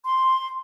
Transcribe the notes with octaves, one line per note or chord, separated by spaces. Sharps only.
C6